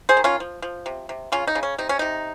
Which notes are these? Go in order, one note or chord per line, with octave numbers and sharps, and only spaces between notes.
G#4 C5
D#3
C#4 F4
F3
F3
C3
C3
C#3 C#4 F4
D#4
C#3
C#4
C3 D#4
C#4
C3 D#4